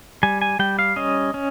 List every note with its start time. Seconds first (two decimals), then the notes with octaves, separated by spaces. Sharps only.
0.23 G3 G#5
0.42 G#5
0.59 G3 G5
0.79 F5
0.96 C#4 D#5
1.34 C#4